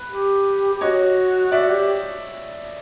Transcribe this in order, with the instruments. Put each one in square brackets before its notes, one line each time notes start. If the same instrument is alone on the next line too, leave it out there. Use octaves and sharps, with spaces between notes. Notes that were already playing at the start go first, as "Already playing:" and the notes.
Already playing: [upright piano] B4
[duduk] G4
G4
[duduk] F#4 [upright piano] C#5 D#5
[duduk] F#4 [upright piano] D5 E5
[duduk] G4